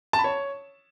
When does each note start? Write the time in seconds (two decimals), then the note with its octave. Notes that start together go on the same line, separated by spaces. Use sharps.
0.13 A5
0.19 B5
0.24 C#5